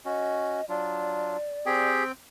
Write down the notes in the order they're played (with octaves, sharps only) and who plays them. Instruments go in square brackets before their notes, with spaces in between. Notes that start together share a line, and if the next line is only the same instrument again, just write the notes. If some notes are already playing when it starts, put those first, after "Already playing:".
[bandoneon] C#4 F#4 [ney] D#5
[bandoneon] F#3 D4 F4 [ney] D5
[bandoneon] C4 G5 [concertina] G4 G#4